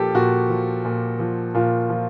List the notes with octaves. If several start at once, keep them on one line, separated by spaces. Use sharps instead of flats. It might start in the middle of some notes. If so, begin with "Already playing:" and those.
Already playing: A#2 F3 G4 A4
A#2 F#4
F3
A#2
F3
A#2 F4
F3